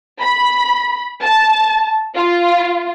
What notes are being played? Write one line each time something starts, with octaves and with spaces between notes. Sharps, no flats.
B5
A5
F4